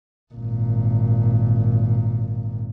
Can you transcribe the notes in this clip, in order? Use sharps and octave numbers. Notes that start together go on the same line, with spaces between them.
G#1 A#2